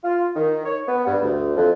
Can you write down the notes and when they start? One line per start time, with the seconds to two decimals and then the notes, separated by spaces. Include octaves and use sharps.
0.04 F4
0.35 D#3
0.65 C#5
0.87 B3
1.06 G2
1.22 D2
1.56 F2